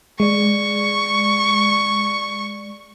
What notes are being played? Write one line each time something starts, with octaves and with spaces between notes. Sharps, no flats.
G#3 D5 C#6